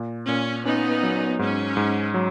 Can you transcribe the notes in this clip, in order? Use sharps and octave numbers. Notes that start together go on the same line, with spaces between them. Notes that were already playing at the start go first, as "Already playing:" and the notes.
Already playing: A#2
A#2 C#4
B3 C#4 D#4
F#3
G#2 C#4
G#2
F#3